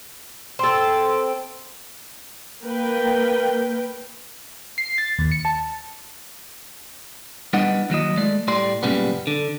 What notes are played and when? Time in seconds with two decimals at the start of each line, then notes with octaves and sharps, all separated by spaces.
0.59 C4 A4
2.63 A#3 A#4 B4 G5
4.78 C7
4.98 A6
5.19 D#2
5.32 C#7
5.45 A5
7.53 G3 B3 D4 E4 D#5 F#5
7.90 D#2 F#3 E4 D#5
8.17 G#3 A3 D5
8.48 A2 G3 D5 C6
8.83 F#2 A#2 C#3 G3 B3
9.27 D3